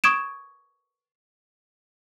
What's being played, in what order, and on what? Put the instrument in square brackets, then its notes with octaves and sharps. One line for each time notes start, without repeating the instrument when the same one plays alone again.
[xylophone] C#6 D#6 G#6 D7 E7